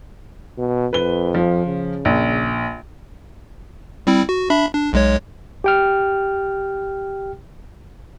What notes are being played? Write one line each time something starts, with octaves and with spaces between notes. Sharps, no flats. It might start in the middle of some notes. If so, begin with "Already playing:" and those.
B2
F2 B4 G7
F3
C#3
A#1
G3 C4 E4
F#4
D4 E5 B5
D4
B1 G#3 C#5
G4 G5 F6